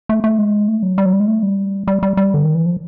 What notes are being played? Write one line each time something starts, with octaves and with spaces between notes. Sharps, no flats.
A3
A3
G#3
A3
F#3
G3
F#3
G3
G#3
A3
G3
G3
G3
G3
D3
D#3
E3
F3